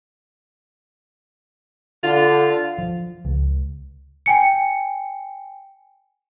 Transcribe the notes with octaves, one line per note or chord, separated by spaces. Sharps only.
D3 F4
F3
C#2
G5 G#5 C#7